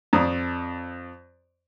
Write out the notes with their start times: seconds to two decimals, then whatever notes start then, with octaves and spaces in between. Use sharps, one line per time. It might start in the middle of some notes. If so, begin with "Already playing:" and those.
0.13 F2 D5 A#5 D#6